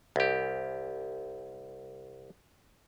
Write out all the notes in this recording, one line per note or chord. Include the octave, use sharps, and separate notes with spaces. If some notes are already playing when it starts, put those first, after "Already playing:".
C2 G4